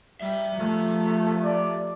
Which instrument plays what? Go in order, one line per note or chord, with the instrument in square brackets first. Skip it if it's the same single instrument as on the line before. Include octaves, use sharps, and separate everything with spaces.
[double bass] G3 [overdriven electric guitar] G4 E5
[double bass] F3 A3
[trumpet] D5